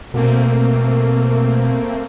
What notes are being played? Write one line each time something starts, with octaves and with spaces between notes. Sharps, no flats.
B2 A3 A#3 C4